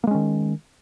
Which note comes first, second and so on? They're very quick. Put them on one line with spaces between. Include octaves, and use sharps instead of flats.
A#3 G#3 C#4 D#3